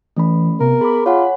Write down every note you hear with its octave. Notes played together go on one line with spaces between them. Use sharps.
E3 A3 C#4 B5
C3 B3 A#4
G#4 B5 D6
F4 C#5 F#5 G#5